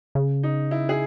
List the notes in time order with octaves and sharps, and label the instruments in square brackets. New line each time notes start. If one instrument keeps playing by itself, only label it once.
[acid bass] C#3
[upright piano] D#4
E4
G#4